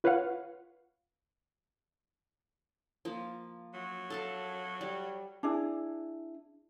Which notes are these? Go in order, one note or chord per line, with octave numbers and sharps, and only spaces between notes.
F4 B4 C#5 F5 F#5
F3 A#3
F#3
A4 F5 A5
G3
D4 E4 G#4